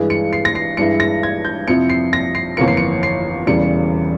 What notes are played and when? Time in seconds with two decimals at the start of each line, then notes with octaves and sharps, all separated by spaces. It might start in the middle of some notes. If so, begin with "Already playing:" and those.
Already playing: G2 E3 G#3
0.10 C#7
0.33 C7
0.45 A#6
0.55 C7
0.77 G2 E3 G#3 E4 C#7
1.00 A#6
1.23 G#6
1.45 G6
1.68 F2 C3 F3 C4 E4 C#7
1.89 C7
2.13 A#6
2.35 C7
2.57 G1 F2 E3 A#3 C#7
2.68 C7
2.77 C#7
3.03 C7
3.47 E1 E2 C#3 E3 G3 C#7